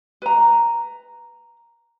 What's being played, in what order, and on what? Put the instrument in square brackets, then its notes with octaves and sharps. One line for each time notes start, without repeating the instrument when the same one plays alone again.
[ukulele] B4 A#5